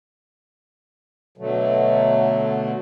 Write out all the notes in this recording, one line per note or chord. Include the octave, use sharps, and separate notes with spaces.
B2 D3 F#3 A3